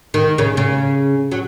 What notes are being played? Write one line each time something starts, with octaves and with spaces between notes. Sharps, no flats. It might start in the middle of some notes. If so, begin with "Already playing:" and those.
D#3
C#3
C#3
F#3